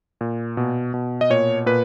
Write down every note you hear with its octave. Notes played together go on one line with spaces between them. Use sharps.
A#2
B2
B2
D#5
A#2 C#5
A#2 B4